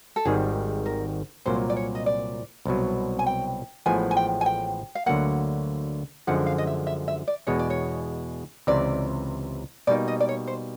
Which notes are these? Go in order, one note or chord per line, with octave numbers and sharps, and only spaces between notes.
A4
G#1 G#2 D#3 G3 G#4
A#4
C2 A#2 F#3 A#3 C5
D5
C#5
D#5
D5
C2 B2 F#3
G#5
G5
A1 A2 F3 G#3 B3 G#5
G#5
G5
G#5
G5
F5
D2 D3 F#3 A#3 F#5
F#2 D3 F3 G#3 F#5
F5
D#5
E5
E5
E5
D5
E2 B2 G#3 C#5
D5
C#5
C#2 C3 E3 D5
B2 G3 A#3 D#4 D5
D#5
D5
C#5
C5